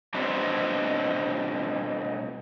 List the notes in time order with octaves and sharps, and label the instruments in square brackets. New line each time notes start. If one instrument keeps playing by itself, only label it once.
[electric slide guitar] B2 G3 C4 D4